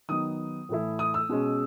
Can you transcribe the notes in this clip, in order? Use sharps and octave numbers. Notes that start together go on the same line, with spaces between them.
D#3 F#3 B3 D#4 D#6
A2 E3 A3 E4
D#6
E6
B2 G#3 C#4